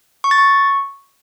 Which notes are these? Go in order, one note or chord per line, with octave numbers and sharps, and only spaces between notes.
C#6
A6
C#6